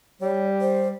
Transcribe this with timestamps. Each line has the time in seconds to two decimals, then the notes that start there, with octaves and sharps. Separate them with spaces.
0.21 G3 C#5
0.61 C5